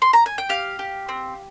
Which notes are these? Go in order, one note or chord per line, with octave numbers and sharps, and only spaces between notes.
C6
A#5
G#5
G5
G4 F5
G4
C4